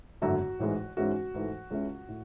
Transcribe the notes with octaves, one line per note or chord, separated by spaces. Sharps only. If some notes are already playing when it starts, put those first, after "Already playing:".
G#1 F#2 D3 A3 E4 F#4
A1 G#2 E3 G#3
G#2 E3 G#3 C#4 E4 F#4
G#2 E3 A3
C#2 C#3 G#3 C#4 E4
A2